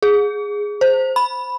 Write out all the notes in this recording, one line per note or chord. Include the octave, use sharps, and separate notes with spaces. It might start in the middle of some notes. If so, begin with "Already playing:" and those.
G#4
C5
B5